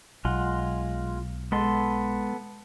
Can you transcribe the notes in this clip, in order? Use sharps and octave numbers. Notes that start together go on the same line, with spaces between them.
B1 G#3 F4 F#5
G#3 B3 A4 C6